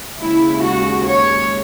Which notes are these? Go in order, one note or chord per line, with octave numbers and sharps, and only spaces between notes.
D#2 C#3 G#3 E4
F#4
C#5